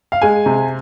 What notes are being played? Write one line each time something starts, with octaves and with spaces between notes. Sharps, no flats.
F5
G#3 G#5
C3